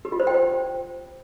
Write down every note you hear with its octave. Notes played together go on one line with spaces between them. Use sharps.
G4
F4
C5
G5
C5